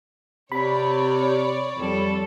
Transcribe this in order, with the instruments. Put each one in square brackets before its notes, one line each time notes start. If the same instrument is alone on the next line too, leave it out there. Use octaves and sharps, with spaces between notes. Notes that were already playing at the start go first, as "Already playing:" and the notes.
[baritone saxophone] C3 [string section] C#5 D5 [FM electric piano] B5
[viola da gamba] F2 G3 A4